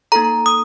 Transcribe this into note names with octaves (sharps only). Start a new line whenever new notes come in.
A#3 D#4 A4 A#5
D#6